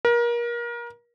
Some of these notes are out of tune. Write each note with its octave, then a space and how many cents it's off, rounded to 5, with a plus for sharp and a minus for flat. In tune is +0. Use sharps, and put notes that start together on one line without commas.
A#4 +30